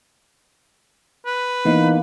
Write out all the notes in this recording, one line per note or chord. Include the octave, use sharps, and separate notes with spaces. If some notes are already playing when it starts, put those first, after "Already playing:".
B4
E3 A#3 B3 D#4